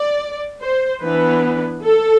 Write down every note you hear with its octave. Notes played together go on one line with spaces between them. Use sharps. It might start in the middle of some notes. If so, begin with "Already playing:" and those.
Already playing: D5
C5
E3 B3 D4 B4
A4